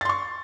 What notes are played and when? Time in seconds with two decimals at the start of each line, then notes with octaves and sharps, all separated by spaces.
0.01 A6
0.05 C6
0.09 C#6